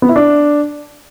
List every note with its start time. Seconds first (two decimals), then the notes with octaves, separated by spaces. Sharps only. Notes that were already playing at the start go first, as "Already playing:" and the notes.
0.02 B3
0.09 E4
0.16 D4